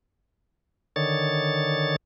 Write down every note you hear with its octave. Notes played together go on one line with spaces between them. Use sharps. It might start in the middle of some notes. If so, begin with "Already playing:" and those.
D3 D#3 C#5 A6